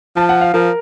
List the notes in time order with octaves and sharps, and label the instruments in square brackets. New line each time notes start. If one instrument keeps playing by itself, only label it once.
[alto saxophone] F3 [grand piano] A5
[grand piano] F#5
F5
[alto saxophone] F3 [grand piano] A#4